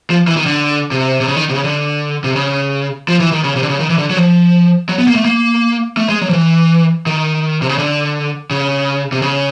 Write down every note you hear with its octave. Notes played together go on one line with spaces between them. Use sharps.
F3
E3
D#3
D3
C3
C3
C#3
D#3
C3
C#3
D3
C3
C#3
F3
E3
D#3
C#3
C3
D3
C#3
D#3
E3
D3
F#3
F3
F#3
B3
A#3
A3
A#3
A3
G#3
F#3
F3
E3
D#3
C3
C#3
D3
C#3
C3
C#3